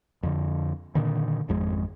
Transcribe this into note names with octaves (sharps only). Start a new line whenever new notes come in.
F2 D3
A#2 D3 D#3
G#1 F2 G#3